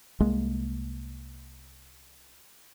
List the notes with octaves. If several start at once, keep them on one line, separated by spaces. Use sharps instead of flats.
C2 G#3 A#3